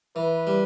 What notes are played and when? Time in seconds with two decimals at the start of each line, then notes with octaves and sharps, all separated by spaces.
0.16 E3 B4
0.47 G3